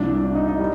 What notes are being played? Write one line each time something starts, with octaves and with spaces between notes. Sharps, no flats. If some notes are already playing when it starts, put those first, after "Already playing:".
Already playing: C2 C3 F3 D4
D4
D#4
D#4
G3